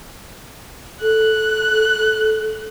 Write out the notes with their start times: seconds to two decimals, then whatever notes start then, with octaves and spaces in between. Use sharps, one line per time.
1.02 A4 F#6